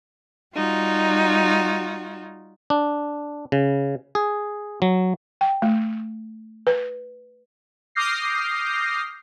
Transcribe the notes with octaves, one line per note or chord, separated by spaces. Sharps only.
G3 D#4 F4 F#4
D4
C#3
G#4
F#3
G5
A3
B4
D6 D#6 F6 G6 A#6 C7